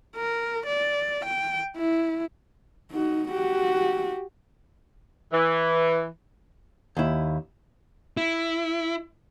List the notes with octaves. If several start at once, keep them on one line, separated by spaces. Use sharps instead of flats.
A#4
D5
G5
E4
D#4 F#4
F#4 G4
E3
D#2 E4
E4